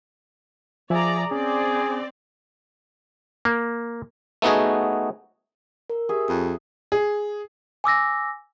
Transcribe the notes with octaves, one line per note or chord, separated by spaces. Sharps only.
F3 G#4 D5 E5 G#5 A#5
C4 C#4 G#4 D5
A#3
A3 B3 D#4 F#4 G#4
A#4
G4 G#4 E5
F2
G#4
G#5 D6 E6 A#6